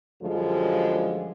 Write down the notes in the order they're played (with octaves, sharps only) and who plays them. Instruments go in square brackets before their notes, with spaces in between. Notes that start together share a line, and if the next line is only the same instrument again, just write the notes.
[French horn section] F#2 D3 F3 G3 G#3